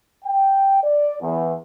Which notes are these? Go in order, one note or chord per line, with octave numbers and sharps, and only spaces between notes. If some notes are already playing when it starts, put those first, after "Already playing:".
G5
D5
E2